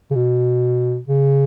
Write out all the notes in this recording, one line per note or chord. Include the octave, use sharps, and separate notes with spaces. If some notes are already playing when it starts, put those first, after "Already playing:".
C#3
B2
C#3